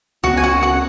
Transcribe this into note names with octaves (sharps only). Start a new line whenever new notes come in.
C#2 C#3 E3 B3 F#4 F#5
G#5
F#4 F#5
F#4 F#5